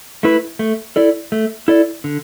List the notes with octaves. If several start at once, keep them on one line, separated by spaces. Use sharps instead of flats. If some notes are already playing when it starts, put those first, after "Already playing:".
A3 E4 B4
A3
E4 A4 D5
A3
E4 A4 D5
D3